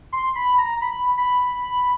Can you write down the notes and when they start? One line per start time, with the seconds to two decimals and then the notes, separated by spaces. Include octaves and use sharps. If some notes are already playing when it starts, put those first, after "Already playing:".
0.12 C6
0.35 B5
0.58 A#5
0.82 B5
1.17 B5